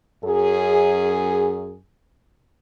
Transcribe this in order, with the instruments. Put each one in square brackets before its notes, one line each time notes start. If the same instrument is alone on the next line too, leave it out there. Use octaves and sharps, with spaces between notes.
[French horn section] F#2 G#4